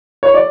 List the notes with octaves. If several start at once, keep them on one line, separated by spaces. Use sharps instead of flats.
C#5
D5